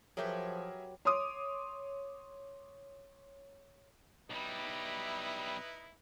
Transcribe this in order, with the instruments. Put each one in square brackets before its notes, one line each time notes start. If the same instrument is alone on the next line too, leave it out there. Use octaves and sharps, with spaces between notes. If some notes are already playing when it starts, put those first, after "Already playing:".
[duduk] F3 [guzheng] F#3 G4 B4 [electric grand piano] G#4 A#4 E5
[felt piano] C#5 C6 D6 D#6
[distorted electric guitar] B1 G3 [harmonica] B3 D#4 E4